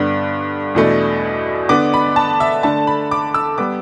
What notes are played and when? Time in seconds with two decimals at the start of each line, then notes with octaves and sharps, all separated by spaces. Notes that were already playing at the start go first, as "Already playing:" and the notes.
Already playing: G2 D3 B3 D4
0.75 E2 B2 A3 D4
1.69 D3 B3 D4 D6
1.94 B5
2.16 A5
2.40 E5
2.63 D3 A3 D4 A5
2.87 B5
3.11 D6
3.34 E6
3.58 G3 B3 D6